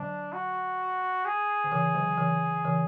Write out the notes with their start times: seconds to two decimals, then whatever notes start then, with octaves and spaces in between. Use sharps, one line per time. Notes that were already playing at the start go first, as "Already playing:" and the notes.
Already playing: D3 F#3 D4
0.33 F#4
1.25 G#4
1.64 D3
1.72 C#3 E3
1.95 D3 F#3
2.18 C#3 E3
2.64 C#3 E3